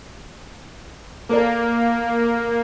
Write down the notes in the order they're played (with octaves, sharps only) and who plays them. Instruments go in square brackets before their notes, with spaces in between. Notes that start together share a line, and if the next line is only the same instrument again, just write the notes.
[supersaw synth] A#3 [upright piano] A4 A#4 D5